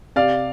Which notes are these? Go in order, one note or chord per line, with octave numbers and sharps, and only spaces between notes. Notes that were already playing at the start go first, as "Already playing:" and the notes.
C3 D5 F5